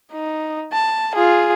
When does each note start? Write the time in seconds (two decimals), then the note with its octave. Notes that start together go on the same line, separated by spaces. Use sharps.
0.12 D#4
0.73 A5
1.15 F4 G#4